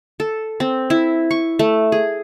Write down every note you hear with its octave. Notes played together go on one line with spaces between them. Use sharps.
A4
C4
E4
C#6
A3
G#4